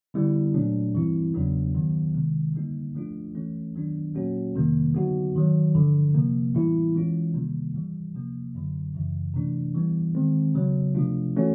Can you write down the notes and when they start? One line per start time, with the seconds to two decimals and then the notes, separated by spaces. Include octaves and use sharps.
0.14 D3 G3 B3 E4
0.54 A#2 F#3 A3 D4
0.94 G2 E3 G3 C4 E4
1.34 E2 C#3 F#3 B3 D4
1.75 G2 D#3 F#3 B3
2.14 C3 D#3 G#3
2.54 D3 G3 A#3 D#4
2.95 G#2 F3 A3 D4 F4
3.35 E3 A3 C#4
3.75 D#3 F#3 B3 D4
4.14 A#2 F#3 A#3 C#4 F#4
4.54 F2 C3 D#3 G3 A#3
4.95 D3 F#3 B3 D#4 F#4
5.34 G#2 D#3 F#3
5.75 G2 D3 F3
6.15 C3 F3 A#3
6.55 A2 E3 G3 B3 E4
6.95 E3 G#3 C#4 F4
7.34 C3 D#3 G3 A#3
7.74 G#2 E3 G3
8.15 C3 F3 A#3
8.55 F#2 D3 F#3
8.95 F#2 C#3 E3
9.34 C3 E3 A3 D4
9.74 E3 G3 B3
10.15 D#3 G#3 C4
10.55 C#3 F#3 B3
10.95 C3 F3 A3 D4 F4
11.36 E3 A3 C#4 F#4